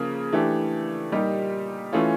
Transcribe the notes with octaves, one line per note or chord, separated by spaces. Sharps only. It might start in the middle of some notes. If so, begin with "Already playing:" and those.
Already playing: C#3 F3 A#3
E3 A3 D4 G4
A#2 G3 A#3 D#4 G4
E3 A3 C#4 F4